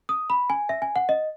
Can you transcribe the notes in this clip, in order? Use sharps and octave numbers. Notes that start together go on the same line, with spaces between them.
D#6
B5
G#5
E5
G#5
F#5
D#5